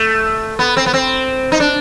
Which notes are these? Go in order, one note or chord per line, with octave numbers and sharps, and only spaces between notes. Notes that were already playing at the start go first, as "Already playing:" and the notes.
Already playing: A3
B3
C4
B3
C4
D#4
D4